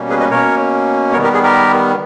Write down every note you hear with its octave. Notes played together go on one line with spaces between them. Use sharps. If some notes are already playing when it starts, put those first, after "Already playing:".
Already playing: B2 G3 A#3 C#4
G#4 B4
B4 D#5
B2 A#3 C#4 A#4 C#5
D#3 G3 B3 A#4 C#5
G4 A#4
G#4
G4 A#4